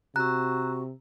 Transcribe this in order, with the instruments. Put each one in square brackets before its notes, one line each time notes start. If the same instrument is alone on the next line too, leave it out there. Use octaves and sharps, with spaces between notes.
[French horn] C3 [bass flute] F#4 [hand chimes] A#5 E6 [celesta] F#6